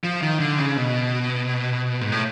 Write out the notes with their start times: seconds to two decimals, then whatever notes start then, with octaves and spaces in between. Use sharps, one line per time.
0.04 F3
0.22 D#3
0.40 D3
0.58 C#3
0.77 B2
2.01 G#2
2.12 A2